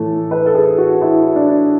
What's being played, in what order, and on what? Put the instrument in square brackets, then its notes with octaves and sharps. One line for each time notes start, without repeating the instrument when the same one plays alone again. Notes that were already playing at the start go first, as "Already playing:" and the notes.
Already playing: [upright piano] A2 E3 A3 A4
B4
A4
G#4
F#4
E4
D4